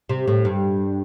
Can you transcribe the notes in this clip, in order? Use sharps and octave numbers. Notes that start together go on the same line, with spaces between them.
C3
A2
G2